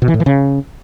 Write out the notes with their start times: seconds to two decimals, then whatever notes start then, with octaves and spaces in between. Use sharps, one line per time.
0.02 B2
0.08 E3
0.14 A2
0.20 E3
0.26 C#3